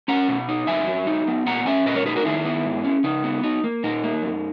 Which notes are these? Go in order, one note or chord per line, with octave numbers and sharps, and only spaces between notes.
C#4 F#5 A#5
B2
D#4
F#2 E5 G#5
F#3
D#4
B3
A#2 F#5 A#5
C#4 E5 G#5
A#2 B4 D#5
A#4 C#5
D#4 G#4 B4
F#4 A#4
D#3 E4 G#4
B3
G#2
C#4
C#3 D#4
B3
D#4
A#3
A#2 D#4
A#3
F#2